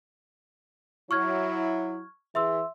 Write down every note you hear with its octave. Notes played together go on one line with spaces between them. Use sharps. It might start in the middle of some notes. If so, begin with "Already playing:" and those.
F#3 E4 C#6 F6 G#6
E3 G#4 E5 C6 E6